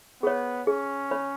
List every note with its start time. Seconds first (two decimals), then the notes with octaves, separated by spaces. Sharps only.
0.23 B3 G#4 C#5
0.67 C#4 G#4
1.11 C#5 B5